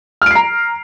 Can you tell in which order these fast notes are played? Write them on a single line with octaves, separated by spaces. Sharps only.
F6 D7 C7 A#5